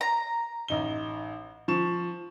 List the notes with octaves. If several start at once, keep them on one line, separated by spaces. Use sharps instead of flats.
A#5
A1 D#4 G7
F3 C#6 E7